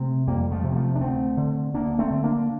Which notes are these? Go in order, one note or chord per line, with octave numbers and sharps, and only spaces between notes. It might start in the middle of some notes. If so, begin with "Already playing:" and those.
Already playing: C3 A3 C4
F2 G3 A#3
F3 A3
C3
A#3
F3 A3
D4
D2 A3 C4
D3
D2 A#3 D4
A3 C4
D3
A#3 D4